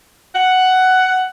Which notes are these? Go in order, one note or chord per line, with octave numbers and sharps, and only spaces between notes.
F#5